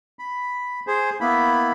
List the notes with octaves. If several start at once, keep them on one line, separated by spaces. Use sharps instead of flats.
B5
G#4 C5
A#3 B3 E4 B5